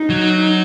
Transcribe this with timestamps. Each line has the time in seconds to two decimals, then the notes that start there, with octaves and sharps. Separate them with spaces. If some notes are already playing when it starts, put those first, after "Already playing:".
Already playing: D#4
0.10 F#3